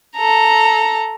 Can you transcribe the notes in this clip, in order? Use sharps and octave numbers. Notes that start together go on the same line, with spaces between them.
A4 A#5